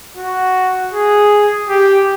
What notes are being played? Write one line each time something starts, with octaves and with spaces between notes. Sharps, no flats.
F#4
G#4
G4